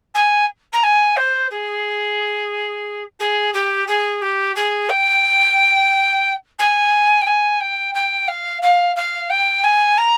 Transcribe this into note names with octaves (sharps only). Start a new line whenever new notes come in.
G#5
A#5
G#5
C5
G#4
G#4
G4
G#4
G4
G#4
G5
G#5
G5
G#5
G5
G5
F5
F5
F5
G5
G#5
A#5